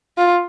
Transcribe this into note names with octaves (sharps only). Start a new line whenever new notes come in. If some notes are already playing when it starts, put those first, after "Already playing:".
F4